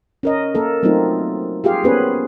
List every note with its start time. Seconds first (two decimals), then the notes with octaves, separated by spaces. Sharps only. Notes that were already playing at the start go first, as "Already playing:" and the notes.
0.23 C#4 A#4 D#5
0.55 A#3 A4 A#4
0.83 F#3 A3 A#3 C4 D#4 F4
1.64 F4 G4 G#4 F5
1.84 A#3 B3 C#4 G#4 B4 C5